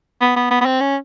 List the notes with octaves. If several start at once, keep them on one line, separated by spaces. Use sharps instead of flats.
B3
B3
B3
B3
C4
C#4